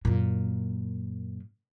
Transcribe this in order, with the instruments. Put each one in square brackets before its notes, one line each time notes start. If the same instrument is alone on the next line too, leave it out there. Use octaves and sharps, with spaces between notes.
[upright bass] F#2 A#2